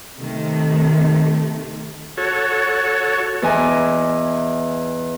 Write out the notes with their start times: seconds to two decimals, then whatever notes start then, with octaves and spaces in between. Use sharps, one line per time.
0.18 C3 D#3 A3
2.17 F#4 A4 C#5
3.42 E2 D#5 E5 G#5 A#5 D6